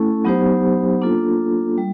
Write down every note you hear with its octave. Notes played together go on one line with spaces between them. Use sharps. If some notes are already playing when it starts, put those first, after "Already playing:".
Already playing: A3 C#4 E4 A4
F#3 B3 D#4 G4 C5
A#3 D4 F4 A4
G3